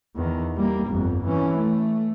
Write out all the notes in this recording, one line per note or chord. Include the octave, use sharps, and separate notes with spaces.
E2 D#3
G3 A#3
G1 F2
E3 C#4
A3